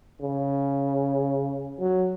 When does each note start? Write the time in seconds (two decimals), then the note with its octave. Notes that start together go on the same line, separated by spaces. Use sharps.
0.22 C#3
1.79 F#3